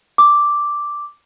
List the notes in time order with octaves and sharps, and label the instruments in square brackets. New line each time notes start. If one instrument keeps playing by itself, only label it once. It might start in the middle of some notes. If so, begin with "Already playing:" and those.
[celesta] D6